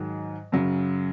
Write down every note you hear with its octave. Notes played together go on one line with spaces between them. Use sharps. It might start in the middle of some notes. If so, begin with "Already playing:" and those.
Already playing: G#2 D#3 F#3
F#2 C#3 F#3